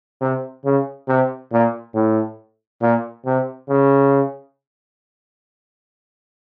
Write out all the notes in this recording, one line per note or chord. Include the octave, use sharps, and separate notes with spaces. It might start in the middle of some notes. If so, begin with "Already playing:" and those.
C3
C#3
C3
A#2
A2
A#2
C3
C#3